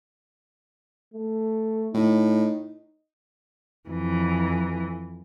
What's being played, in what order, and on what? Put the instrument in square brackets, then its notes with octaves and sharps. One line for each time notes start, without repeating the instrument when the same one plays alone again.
[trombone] A3
[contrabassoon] A2 [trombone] D#4
[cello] F2 E3